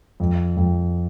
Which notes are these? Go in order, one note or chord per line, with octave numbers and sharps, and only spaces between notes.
F2
F2